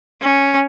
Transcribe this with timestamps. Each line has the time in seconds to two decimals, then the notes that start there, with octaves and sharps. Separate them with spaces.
0.22 C#4